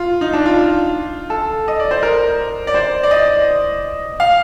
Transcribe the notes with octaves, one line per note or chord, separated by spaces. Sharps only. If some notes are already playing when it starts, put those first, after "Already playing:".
Already playing: F4
D#4
D4
F4
A4
D#5
D5
C5
A#4
D5
C5
D5
D#5
F5